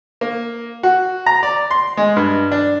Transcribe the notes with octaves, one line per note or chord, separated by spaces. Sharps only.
A#3
F#4
A#5
D5
C6
G#3
G2
D4